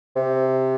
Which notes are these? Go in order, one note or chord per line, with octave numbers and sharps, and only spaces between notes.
C3